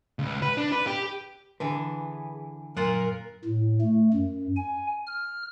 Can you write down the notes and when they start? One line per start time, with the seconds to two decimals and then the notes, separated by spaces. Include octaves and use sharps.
0.19 C#2
0.42 B4
0.58 D4
0.72 B4
0.87 G4
1.60 D3 E3 G#4 B4
2.77 F#2 A#2 F4 A#4 F#5
3.45 A2
3.81 A3
4.13 F#2
4.56 G#5
5.07 F6